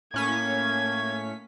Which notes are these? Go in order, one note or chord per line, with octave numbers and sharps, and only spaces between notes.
A2 A#3 C#4 G#6 B6